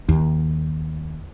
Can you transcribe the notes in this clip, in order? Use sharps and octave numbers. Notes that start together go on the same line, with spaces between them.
D#2